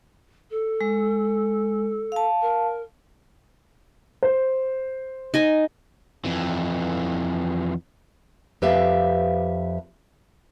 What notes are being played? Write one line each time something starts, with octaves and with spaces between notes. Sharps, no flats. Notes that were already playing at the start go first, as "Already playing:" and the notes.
A4
G#3
F5 A5
A#4
C5
D#4 D#5 G#5
F2 E3
F2 G4 B4 E5 F5